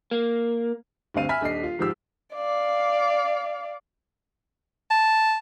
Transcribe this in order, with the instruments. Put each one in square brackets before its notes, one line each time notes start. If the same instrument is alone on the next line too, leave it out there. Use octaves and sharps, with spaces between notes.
[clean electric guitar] A#3
[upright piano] D2 G2 C4 F5 D#7
E5 G#5 B5 F6 B6
D#1 D4 D#5 C7
F4
F1 G#2 F3 G4 E6
[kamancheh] D5 F5
[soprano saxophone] A5